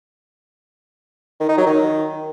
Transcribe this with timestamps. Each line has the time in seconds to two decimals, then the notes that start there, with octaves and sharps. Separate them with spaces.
1.40 D#3
1.49 D#4
1.57 F#3
1.66 D#3